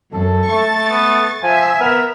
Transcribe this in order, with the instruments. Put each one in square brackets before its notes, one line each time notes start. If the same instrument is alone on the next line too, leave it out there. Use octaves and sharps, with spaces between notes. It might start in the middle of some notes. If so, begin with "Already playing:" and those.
[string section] F#2 [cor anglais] A4
[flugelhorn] A3 [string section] C#6 A6
[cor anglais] B3
[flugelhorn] F3 [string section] E5 [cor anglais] G#5
[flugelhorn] B3 [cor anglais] A#4